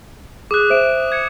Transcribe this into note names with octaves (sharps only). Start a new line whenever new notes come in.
G#4 D6 D#6 F#6
C5 E5 F#6 D7 E7
G#6 C#7